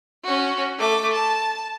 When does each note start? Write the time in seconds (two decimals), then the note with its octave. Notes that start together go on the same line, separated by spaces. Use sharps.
0.24 C#4 F#4
0.78 A3 D6
1.13 A5